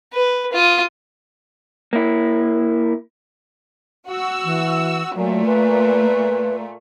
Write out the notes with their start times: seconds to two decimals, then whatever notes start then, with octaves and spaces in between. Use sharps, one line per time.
0.13 B4
0.53 F4 D#6
1.93 A#3 E4
4.08 F#4 E6
4.44 E3
5.16 A#2 F#3 A3
5.46 B4